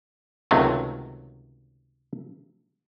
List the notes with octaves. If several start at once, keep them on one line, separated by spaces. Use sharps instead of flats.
C#2 C3 D#3 F#3 A3